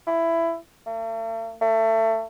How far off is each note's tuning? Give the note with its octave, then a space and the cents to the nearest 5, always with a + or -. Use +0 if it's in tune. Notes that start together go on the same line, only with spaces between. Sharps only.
E4 +15
A3 +45
A3 +25